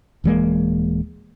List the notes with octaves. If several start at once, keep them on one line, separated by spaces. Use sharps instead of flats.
D#1 E3 G#3 A#3